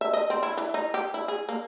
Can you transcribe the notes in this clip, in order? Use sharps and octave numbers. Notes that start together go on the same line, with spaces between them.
E5
D#5
C4
E4
E3
D#4
G4
E4
G#4
A#3